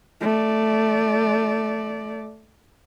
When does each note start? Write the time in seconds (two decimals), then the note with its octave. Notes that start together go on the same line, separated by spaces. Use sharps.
0.21 A3 D5